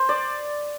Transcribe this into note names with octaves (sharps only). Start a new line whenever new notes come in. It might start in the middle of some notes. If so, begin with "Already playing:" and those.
Already playing: C5
D5